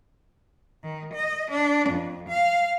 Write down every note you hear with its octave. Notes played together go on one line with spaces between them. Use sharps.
D#3
D#5
D4
F2
F5